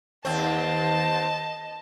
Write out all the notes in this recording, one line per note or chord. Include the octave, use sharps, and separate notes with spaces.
D#2 C4 D#5 A5